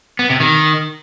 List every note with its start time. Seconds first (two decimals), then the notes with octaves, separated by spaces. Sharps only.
0.19 B3
0.30 C3
0.40 D#3